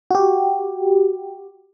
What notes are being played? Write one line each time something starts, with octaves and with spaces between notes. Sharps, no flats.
F#4 G4